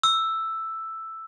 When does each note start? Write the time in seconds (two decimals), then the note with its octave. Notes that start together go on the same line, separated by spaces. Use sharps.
0.03 E6